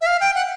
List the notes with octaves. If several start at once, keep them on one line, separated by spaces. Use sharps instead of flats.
E5
F5
G5
F#5